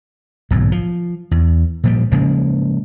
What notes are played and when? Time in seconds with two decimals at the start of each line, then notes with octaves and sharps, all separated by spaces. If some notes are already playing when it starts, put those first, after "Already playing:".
0.51 D1 B1 G#2
0.72 F3
1.31 E2
1.84 A#2 F3 G3
2.12 C#3 F3 G#3 A#3